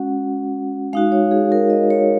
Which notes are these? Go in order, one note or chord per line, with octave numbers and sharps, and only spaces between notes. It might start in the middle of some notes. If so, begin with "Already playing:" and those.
Already playing: G#3 C#4 F#4 F#5
G#3 D#4 F#4 F5
C#5
G#4
A#4
D#5
C#5